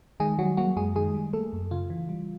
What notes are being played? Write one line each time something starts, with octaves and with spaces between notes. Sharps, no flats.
D#3 G#3 G#4
F#3 G3 F#4
F#3 A#3 F#4
F#2 G#3 G#4
D#3 G#3 G#4
G3
A3 A#3 A4
F#2
C#3 F4
E3
G3